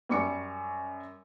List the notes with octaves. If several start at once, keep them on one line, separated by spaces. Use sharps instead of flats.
F#2 G3 C#6 D6 C#7